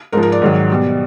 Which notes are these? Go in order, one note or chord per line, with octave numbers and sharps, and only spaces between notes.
G#2 F3 A#4
A#4
D5
G#2 D#3 F#3
B2 G3